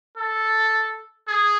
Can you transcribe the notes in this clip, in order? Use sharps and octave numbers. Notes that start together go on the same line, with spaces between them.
A4
G#4